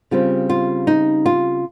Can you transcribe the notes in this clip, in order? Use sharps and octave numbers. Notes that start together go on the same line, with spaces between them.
C#3 G3 C4 F4
F4
D#4
F4